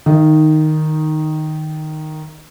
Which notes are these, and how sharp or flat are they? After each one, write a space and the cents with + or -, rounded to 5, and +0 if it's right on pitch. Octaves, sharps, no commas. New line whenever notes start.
D#3 -5 D#4 +0 F5 -45